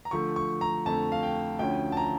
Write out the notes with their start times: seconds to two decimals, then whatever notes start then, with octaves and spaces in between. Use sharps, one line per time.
0.05 A#5
0.11 D3 F3 A3 C#6
0.36 C#6
0.61 A#5
0.85 F2 D3 A3 A5
1.12 F5
1.23 G5
1.59 D2 D3 F3 C#4 G5
1.92 A5
1.97 A#5